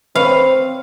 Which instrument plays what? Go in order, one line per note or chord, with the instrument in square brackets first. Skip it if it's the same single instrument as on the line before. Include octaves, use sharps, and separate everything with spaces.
[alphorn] C4 [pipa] B4 C#5 [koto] F5